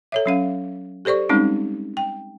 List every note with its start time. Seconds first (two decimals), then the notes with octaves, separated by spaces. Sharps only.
0.12 A4 C#5 E5
0.26 F#3 C#4 F5
1.05 G4 A4 C5 D5 C#6
1.29 G3 G#3 C4 C#4 D#4
1.97 G5